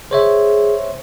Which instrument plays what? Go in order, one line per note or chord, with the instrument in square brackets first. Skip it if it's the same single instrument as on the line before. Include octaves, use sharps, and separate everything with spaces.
[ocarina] G#4 [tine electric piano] C5 C#5 E5